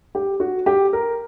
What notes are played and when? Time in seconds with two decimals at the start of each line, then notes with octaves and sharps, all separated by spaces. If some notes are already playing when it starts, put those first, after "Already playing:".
0.15 G4
0.40 F#4
0.66 G4
0.93 A#4